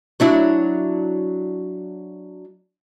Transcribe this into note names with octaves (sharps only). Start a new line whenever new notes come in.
F#3 D4 E4